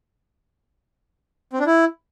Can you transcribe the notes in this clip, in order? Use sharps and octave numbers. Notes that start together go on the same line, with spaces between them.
C4
D4
E4